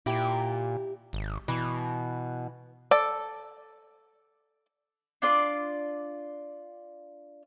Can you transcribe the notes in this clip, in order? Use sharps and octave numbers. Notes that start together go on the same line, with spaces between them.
A#2 E4 G4
G#1
B2 E3
A4 D5
D4 F4 D5